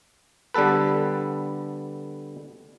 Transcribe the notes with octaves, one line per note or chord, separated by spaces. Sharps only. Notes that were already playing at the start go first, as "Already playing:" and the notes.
D3 G3 B3 A4 B4